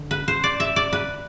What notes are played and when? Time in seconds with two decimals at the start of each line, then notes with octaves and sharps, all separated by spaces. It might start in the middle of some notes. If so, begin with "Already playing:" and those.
Already playing: D3
0.11 B4
0.28 C5
0.44 D5
0.60 E5
0.76 D5
0.93 B4